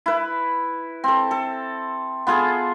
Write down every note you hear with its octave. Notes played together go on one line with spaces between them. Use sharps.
E4 B4
C4 A4
A4
B3 F4 G#4 A4